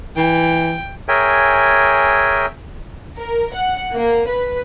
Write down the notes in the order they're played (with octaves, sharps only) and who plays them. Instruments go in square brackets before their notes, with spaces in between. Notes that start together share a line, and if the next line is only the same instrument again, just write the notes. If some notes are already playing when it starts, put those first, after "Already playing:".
[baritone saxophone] E3 [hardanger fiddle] G5
[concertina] G#4 A#4 C#5 E5 G5 G#5
[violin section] A#4
F#5
A#3
B4